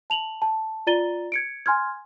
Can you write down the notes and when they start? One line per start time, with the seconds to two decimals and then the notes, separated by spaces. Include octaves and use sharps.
0.10 A5 F7 F#7
0.42 A5
0.87 F4 D5 A#5 A6 D#7 G7
1.32 G#6 C#7 D7
1.66 G#5 C6 F6 G#6